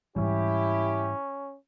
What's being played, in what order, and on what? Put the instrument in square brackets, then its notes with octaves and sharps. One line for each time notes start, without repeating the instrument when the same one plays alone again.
[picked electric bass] G#2 E3 G3 [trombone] C#4 [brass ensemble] E4 G4